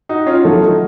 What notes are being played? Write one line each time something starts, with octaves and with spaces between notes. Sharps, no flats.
D#4 F#4
C#4 F4
D#3 F#3 A3 F4 A4
D#4 F#4